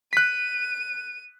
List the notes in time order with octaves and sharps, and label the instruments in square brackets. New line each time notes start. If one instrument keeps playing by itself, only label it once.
[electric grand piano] F#6 B6 [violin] D#7